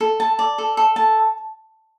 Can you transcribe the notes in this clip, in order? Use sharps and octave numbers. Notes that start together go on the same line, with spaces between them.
A4
A5
D5
A4
A4
A5